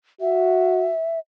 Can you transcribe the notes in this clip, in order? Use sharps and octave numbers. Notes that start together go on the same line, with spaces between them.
F#4 E5